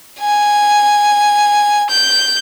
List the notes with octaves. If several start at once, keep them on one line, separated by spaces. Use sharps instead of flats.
G#5
G6